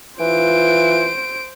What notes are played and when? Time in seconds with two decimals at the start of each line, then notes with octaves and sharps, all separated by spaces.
0.19 E3 F4 C5 D7